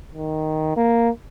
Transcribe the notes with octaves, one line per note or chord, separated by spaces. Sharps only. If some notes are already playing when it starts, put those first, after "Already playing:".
D#3
A#3